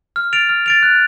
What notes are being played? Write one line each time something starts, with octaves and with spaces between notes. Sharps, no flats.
F6
A6 D7 F7
F6
A6 D7 F7
F#6